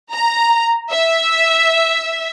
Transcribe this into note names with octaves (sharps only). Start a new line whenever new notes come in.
A#5
E5